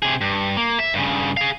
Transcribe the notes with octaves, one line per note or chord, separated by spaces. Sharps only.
C3 G#4
G2
A#3
E5
G2 C#3
G#4 F5